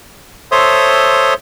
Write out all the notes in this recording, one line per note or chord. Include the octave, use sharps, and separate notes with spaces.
A4 C5 C#5 E5 C6 D#6